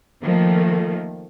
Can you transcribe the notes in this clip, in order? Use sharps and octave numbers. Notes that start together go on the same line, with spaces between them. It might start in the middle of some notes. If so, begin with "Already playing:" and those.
D#3 F3 A3 A#3